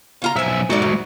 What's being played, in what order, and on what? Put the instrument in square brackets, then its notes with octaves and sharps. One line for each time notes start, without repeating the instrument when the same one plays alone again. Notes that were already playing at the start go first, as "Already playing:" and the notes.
[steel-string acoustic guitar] C#3 F4 A#5
[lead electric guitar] B1 E5 [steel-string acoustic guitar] F3 G#5
[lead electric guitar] G#3 F#4 [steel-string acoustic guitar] D#4 A4 D5
[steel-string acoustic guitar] D2